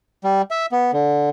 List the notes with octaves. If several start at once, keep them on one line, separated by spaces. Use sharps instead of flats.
G3
E5
B3
D3